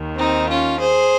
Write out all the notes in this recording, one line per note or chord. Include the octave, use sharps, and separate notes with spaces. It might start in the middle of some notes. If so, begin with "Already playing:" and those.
Already playing: D#2 D#3
C4 D#4
C#4 F4
G#4 C5